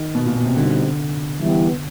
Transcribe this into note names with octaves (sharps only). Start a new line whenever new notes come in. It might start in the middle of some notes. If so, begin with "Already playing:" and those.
Already playing: D#3
B2
A#2
B2
C3
B2 D3 G3 C4 D#4 G4
E3 G3 B3 E4 G4